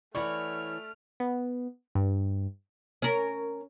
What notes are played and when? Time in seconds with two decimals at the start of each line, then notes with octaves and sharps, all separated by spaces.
0.15 E3 A3 C#5 D5 F#5 B5 C#6 F6
1.20 B3
1.95 G2
3.02 C#4 A#4